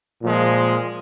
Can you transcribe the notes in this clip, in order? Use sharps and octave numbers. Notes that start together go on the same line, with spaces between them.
A#2 F3 G#3